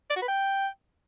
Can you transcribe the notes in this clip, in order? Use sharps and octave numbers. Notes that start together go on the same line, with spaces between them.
D5
F#4
B4
G5